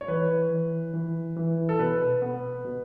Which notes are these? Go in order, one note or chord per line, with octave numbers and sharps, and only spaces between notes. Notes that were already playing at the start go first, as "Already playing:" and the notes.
C#5
E3 B4
E3
E3
E3
A4
B2 B4
B3
B2